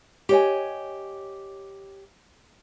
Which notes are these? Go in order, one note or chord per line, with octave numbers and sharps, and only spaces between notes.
G4 C#5 D#5 G#5